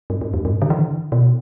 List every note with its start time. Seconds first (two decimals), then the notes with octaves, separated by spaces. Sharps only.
0.10 G2
0.21 G2
0.34 E2
0.45 G2
0.53 A2
0.62 D3
0.70 E3
0.78 D3
1.12 B2